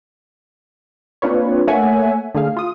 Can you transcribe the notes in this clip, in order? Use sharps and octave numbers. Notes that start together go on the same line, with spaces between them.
A#3 C4 D4 F4 B4 C#5
A3 A#3 C#5 E5 F#5 G#5
D3 A3 G#4 F5
F4 D#6